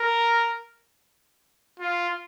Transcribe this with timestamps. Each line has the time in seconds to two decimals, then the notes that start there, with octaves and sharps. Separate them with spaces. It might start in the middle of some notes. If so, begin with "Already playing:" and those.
Already playing: A#4
1.79 F4